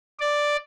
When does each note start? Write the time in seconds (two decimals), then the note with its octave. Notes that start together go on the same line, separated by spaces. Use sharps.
0.20 D5